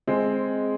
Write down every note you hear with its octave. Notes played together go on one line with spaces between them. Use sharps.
G#3 C4